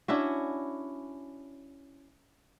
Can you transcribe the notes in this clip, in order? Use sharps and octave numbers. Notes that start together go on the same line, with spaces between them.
C#4 D4 E4 F#4